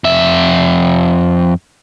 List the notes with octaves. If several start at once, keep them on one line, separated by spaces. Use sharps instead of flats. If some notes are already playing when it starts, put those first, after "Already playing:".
F2 E5